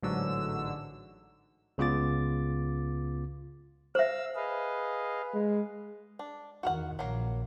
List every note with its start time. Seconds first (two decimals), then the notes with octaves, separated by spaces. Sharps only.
0.02 A1 G#2 D3 F#3 E6
1.78 C#2 C#3 B3 F4 D6 A6
3.95 C5 E5 F5 E6
4.36 G#4 B4 D#5 F5
5.34 G#3
6.19 D4
6.63 E2 D#3 F#4 A#4 F#5
6.99 A#1 F#3 A#3